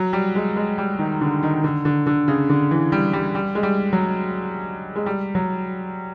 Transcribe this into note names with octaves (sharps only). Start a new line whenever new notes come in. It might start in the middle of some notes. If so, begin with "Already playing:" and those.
Already playing: F#3
G3
G#3
G#3
G3
D#3
D3
D#3
D3
D3
D3
C#3
D3
E3
G3
G3
G3
G#3
G3
F#3
G#3
G3
F#3